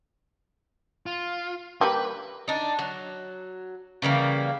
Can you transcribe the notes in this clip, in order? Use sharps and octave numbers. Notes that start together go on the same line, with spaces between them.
F4
G3 A#3 G4 B4
D4 D#4
F#3
C#3 E3 G3 A#3